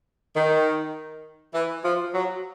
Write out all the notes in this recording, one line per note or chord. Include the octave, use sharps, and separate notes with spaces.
D#3
E3
F3
F#3